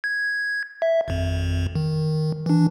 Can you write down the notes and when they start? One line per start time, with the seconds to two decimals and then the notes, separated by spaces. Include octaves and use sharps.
0.04 G#6
0.82 E5
1.08 G#1 F2
1.75 D#3
2.46 E3 D4